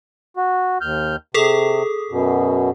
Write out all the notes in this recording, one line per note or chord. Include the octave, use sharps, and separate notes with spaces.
F#4
D#2 F6 G6
C3 G#4 A4 D#6
F#2 B2